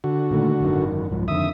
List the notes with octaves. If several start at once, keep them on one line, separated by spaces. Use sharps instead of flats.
D3 F#4
A#2 D#3 A3
G#1 F#2 D#3
C2 G#2 F3
F2 D3 D#3 E5 D#6